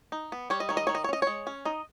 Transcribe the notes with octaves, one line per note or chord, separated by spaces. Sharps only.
D#4
B3
G3 C#5
D#5
D#3 C#5
D#5
D#3 C#5
D#5
C#5
C#4 D#5
G#3 C#5
C#4
D#4 D#5